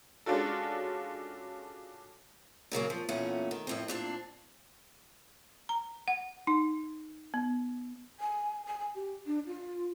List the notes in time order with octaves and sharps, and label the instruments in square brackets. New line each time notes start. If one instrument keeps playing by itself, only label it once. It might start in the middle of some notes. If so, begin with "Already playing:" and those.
[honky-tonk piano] G#3 C#4 D4 F4 F#4 A4
[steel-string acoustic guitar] A#2 C#3 F#3 A#3
F3
E2 A#2 A3 C#4 F#5
D#3
F2 A2 C4
A#2 C4 D4
[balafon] A#5
F#5
D#4
B3
[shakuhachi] G#5
G#5
G#5
G4
D4
F4